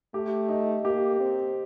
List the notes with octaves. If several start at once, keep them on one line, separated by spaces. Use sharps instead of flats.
A3 G4
D#4
A#3 G4
C4